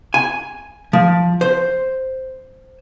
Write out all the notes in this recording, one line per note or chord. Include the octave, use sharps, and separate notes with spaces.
G#5
F3
C5